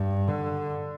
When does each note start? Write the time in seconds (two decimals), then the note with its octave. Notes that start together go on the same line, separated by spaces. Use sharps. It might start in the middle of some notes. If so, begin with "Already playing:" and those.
Already playing: G2
0.28 D3